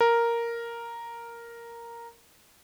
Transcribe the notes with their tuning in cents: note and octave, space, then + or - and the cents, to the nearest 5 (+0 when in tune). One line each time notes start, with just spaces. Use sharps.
A#4 +0